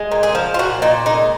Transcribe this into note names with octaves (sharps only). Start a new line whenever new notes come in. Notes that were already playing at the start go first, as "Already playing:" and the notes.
Already playing: G#3
A#2
G#4
F3
F4
A#2 F#4
A#2 D#4
G#3 D#4